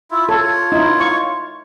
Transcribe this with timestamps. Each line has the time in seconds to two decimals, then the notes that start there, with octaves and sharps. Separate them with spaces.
0.11 E4 F4
0.29 F4 A4 C#5
0.72 D#4 E4
1.00 F5 C#6